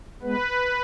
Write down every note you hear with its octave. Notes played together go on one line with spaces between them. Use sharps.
G#3 B3 B4